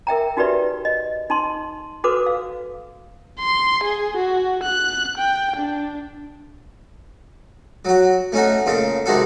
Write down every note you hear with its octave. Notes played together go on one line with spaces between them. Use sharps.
A#4 E5 G5 A#5
D#4 F#4 G4 B4 D5 E5
D#5
D#4 A5 C6
F#4 A4 B4 C5 D6
F5
C6
G#4
F#4
F#6
G5
D4
F#3 F#4
A3 C#4 D#4 F#4
A#2 C#3 A4
C3 D#3 G#3 F#4 A4